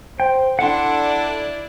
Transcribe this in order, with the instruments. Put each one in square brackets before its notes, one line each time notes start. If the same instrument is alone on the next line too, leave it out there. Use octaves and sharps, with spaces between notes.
[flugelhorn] C5 [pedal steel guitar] G5
[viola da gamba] D4 E4 D5 [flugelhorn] A4 [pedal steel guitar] F#5 C6